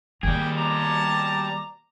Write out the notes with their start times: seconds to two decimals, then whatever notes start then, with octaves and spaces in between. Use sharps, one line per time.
0.23 D#3 G3 A#3 G#4 G5
0.58 B2 D5 A5 A#5